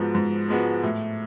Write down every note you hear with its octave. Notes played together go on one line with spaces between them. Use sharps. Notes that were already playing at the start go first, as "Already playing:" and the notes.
Already playing: G#2 F3 G#3 B3 F#4
G#2
F3 G#3 B3 F#4
A2